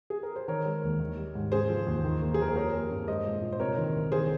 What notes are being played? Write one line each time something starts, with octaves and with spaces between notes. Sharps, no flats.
G#4
A#4
C5
D#3 A#4 C#5
G#3
D#2
D#3
G3
G#2
C#3 G#4 C5
F3
D#2
D#3
A#3
G#4
F2 A#4
C5
G3 A#4 C#5
A#3
G2
G#3 C5 D#5
A#2
A#2
C5
C3 A#4 C#5
D#3
C2
D#3 G#4 C5